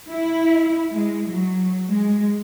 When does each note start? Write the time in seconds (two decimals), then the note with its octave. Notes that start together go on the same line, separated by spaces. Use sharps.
0.10 E4
0.93 G#3
1.30 F#3
1.89 G#3